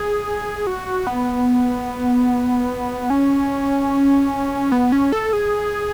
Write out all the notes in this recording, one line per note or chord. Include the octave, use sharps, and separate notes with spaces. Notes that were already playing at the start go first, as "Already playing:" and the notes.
Already playing: G#4
F#4
B3
C#4
B3
C#4
A4
G#4